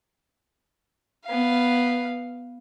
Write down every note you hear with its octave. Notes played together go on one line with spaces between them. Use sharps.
B3 F5